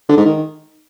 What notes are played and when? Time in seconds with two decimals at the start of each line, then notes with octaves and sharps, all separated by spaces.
0.09 D3
0.17 G#2
0.25 D#3